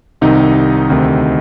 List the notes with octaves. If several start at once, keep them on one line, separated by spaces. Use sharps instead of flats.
C2 C3 D#3 D#4 D#5
D2 C3 D#3